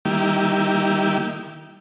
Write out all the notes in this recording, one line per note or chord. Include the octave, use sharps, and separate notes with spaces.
D#3 G3 A#3 E4 G4